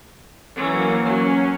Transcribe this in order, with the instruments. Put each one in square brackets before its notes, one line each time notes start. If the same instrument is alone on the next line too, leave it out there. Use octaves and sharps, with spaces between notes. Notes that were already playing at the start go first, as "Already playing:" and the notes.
[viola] E3 C#4 [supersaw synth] F#3 A#3
[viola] F#3 [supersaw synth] C#4